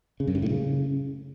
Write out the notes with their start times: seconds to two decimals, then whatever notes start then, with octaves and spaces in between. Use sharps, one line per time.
0.20 C#3
0.27 F#2
0.35 G2
0.42 A2
0.50 C#3